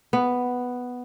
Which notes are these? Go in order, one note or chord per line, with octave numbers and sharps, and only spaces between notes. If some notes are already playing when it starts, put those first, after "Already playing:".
B3